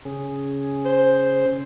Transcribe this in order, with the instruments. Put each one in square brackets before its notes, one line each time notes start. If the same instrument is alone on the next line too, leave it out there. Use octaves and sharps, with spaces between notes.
[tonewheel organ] C#3 C#4 G#4
[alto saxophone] C5